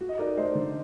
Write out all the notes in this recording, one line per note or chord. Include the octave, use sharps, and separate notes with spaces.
F#4
D#5
D#4 A#4 D5
A3 C5 D#5
D3